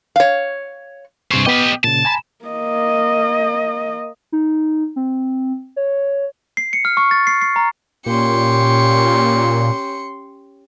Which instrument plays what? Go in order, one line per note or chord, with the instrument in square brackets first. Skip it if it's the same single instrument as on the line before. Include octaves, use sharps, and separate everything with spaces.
[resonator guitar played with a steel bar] C#5 F5
[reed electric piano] G2 C3 C#6 [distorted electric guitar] G#4 C5
[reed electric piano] B3 G5 D6 [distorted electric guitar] G4 D#5
[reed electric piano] A#2 C#3 [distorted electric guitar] A5
[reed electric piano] G#5 A#5 B5
[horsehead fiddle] A#3 D#5
[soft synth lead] D#4
C4
C#5
[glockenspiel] C7
C#7
F6
C#6
A6
C7
C7
A#5
[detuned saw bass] A#2 [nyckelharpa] C#4 G4 [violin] C6 C#7